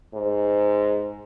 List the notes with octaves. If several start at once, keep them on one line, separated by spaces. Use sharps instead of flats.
G#2